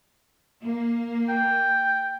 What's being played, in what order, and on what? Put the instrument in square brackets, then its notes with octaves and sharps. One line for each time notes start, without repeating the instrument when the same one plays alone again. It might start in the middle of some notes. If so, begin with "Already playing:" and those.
[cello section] A#3
[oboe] G5